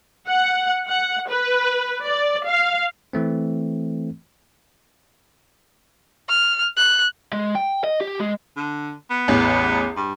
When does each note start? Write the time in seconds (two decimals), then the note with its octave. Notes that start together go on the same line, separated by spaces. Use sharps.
0.29 F#5
0.89 F#5
1.29 B4
2.04 D5
2.47 F5
3.13 E3 A3 C4
6.29 F6
6.77 F#6
7.33 G#3
7.55 G5
7.84 D#5
8.01 G4
8.20 G#3
8.57 D3
9.10 B3
9.28 A1 E2
9.97 G2